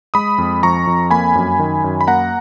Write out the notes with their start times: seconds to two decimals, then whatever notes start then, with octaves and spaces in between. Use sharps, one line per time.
0.14 G#3 B5 D#6
0.38 F2
0.63 F3 A#5 C#6
0.87 F2
1.11 A#3 G#5 B5
1.35 F#2
1.59 D#3
1.84 F#2
2.01 B5
2.07 A#3 F#5 A#5